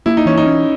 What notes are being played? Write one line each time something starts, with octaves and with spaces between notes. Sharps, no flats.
A#3 E4
D#4
E3 C#4
D#4
C#4